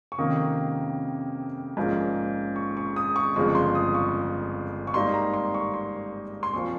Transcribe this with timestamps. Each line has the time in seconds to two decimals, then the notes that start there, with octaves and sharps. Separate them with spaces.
0.12 C#6
0.18 F2 C3 D#3 A#3 C#4 D#6
1.77 A#1 G#2 F3 A#3 C#4
2.56 C#6
2.77 C#6
2.96 D#6
3.16 C#6
3.36 G1 F2 C#3 F3 G#3 C#6
3.55 C6
3.75 D#6
3.95 C#6
4.87 C#6
4.94 G#2 G3 A#3 D#4 C6
5.14 A#5
5.34 C6
5.54 C#6
5.74 C6
6.43 C6
6.53 C2 A#2 F3 C#6